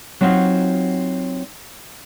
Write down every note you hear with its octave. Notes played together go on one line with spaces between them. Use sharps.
F#3 C4 D#4 F4 F#4